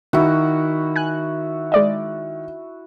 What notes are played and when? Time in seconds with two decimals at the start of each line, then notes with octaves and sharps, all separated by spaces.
0.13 D#3 E4 F#4
0.96 G#5 F#6
1.72 G#3 D5 D#5